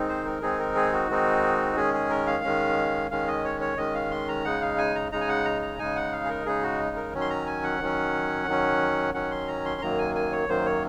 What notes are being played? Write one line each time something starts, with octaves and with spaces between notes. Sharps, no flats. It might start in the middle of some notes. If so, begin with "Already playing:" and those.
Already playing: D#3 G#3 C4 D#4
C5
A#4
D#3 G#3 C4 D#4 G#4
A#4
G#4
F#4
D#3 G#3 C4 D#4
D#3 G#3 C#4 G#4
G#4
A#4
F5
D#3 G#3 C#4
D#3 G#3 C#4 F5
D#5
C#5
C#5
D#3 G#3 C#4 D#5
F5
C6
A#5
C#3 G#3 D#4 F#5
F5
G#5
A#5
C#3 G#3 D#4 A#5
G#5
F#5
A#5
A#5
C#3 G#3 D#4 G#5
F#5
F5
G#4
A#4
C#3 G#3 D#4 G#4
F#4
A#4
D#3 F#3 C#4
C6
A#5
G#5
F#5
D#3 F#3 C#4
D#3 F#3 C#4
D#3 F#3 C#4 F#5
C6
A#5
C6
F#2 D#3 F#3 A#3 A#5
G#5
G#5
C#5
F#2 D#3 F#3 A#3 C5
C#5